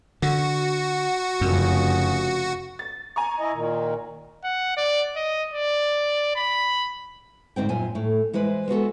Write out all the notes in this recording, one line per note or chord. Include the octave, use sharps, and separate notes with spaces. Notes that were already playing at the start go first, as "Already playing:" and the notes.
D3 F#4
F1 F#2 C#3
A6
G#5 A#5 C#6
E4 D#5
A#2 D#3
F#5
D5
D#5
D5
B5
D2 G#2 C4 G5
F#2 A#2 G#5
A2 A3
E3 G#3 E4 B4 C5
G#3 B3 F#4 A4